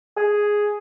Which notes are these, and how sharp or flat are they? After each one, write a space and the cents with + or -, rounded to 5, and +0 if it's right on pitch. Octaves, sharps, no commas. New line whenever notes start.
G#4 +0